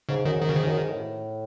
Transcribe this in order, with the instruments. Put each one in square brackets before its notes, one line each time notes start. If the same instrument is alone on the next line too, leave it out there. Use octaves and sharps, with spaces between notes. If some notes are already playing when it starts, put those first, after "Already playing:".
[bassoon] G#2 [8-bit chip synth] C#3
[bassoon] F#2 [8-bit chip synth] D#3
[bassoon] G#2
[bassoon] F#2 [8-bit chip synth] D#3
[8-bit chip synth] C#3
[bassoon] G#2 [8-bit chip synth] D#3
[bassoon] F#2
G#2
A2